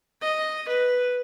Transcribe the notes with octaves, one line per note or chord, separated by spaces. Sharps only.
D#5
B4